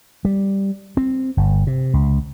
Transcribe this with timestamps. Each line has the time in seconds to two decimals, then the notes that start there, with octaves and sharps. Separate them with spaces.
0.25 G3
0.97 C4
1.37 G1
1.67 C3
1.93 C#2